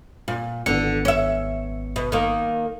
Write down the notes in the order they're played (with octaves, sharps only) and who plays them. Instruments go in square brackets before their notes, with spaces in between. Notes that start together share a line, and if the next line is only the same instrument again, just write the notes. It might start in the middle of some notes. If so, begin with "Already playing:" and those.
[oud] A#2
[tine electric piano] G#1 B3 C#7 [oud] D3
[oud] C#4 E5
B2
D#3 A#3